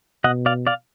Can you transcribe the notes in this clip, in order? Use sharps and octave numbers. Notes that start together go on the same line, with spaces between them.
B2 D#5 F#5
D5 F5
D5 F5